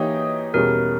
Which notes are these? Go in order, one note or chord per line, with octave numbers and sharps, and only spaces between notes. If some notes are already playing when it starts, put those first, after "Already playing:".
Already playing: E3 A#3 D#4 G4 C#5
E2 B2 G3 C#4 G#4 A#4